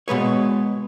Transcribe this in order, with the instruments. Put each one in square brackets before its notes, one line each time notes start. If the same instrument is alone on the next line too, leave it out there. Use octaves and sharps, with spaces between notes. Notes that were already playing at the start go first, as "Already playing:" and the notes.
[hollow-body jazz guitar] B2 G#3 B4 C#5